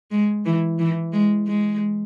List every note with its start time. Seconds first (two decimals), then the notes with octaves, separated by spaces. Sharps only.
0.11 G#3
0.45 E3
0.79 E3
1.13 G#3
1.47 G#3